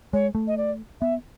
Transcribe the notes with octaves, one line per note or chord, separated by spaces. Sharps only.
G#3 C#5
A3
D#5
D5
B3 E5